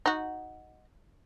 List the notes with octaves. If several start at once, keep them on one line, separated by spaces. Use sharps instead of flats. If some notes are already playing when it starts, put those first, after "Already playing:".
D#4 F#4